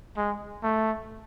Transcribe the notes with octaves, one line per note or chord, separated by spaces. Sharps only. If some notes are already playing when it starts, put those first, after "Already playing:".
G#3
A3